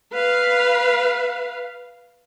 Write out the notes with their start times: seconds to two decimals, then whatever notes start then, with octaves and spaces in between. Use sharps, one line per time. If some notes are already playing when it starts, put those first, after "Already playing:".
0.13 B4 F5